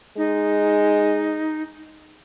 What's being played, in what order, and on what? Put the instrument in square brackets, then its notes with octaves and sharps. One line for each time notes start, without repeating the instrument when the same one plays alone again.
[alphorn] G#3 [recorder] D#4